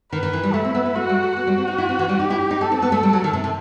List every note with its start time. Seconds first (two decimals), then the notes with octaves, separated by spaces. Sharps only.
0.12 D#3 B4
0.23 D#3
0.33 E3
0.43 G3
0.54 A3 E4
0.65 C4
0.75 B3
0.85 B3
0.95 A3 F#4
1.09 G3
1.23 A3
1.36 B3 F#4
1.47 G3
1.58 C4
1.68 D#4
1.78 E4
1.89 C4
1.99 E3
2.09 G3
2.19 D#4 G4
2.30 E4
2.51 D#4
2.61 D#4 A4
2.72 C4
2.82 B3
2.92 A3
3.03 G3
3.13 F#3
3.24 D#3
3.33 C3
3.44 C3